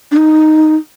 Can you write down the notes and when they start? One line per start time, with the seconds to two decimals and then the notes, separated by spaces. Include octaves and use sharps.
0.11 D4
0.17 D#4